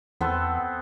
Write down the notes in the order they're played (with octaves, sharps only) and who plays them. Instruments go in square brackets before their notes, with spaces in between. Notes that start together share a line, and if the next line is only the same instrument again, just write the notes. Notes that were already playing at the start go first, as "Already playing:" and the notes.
[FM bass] E2 [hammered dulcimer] B3 C4 A4